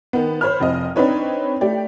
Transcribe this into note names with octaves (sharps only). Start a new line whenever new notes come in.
D#3 B3
C5 C#5 B5 F6
F1 C4 D#5
C4 D4 D#4 B4 C#5
A3 G4 D5